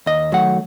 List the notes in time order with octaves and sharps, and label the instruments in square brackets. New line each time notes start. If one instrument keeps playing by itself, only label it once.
[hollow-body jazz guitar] D#2 D#5
D#3 F#3 A3 F#5